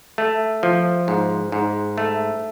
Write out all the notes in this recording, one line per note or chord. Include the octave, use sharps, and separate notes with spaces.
A3
F3
G#2
G#2
A3